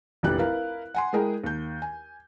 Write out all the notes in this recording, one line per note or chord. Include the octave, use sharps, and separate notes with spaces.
F1 A#1 E3 G4 F#6
E4 A#4 B4 F5
F#5 G#5 C6
G#3 E4 G#4 A#4 G5
D#2 G6
G#5